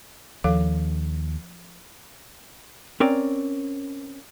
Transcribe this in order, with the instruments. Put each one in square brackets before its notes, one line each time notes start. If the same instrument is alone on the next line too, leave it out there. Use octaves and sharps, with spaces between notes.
[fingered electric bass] D#2 [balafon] F3 A4 F5
[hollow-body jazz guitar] C4 C#4 A#4 D5